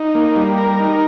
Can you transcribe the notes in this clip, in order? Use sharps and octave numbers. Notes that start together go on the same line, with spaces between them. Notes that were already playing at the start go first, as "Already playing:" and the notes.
Already playing: D#4
A#3
G3
A#4
D#4